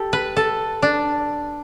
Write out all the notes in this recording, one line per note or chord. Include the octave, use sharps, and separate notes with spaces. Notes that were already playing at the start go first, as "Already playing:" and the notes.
Already playing: G4 A4
B4
A4
D4